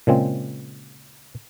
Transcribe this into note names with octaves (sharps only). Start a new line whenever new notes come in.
A#2 C#3 G#3 C4